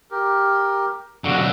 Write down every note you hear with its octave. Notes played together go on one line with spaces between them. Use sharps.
G4 A#4
B1 D3 F#4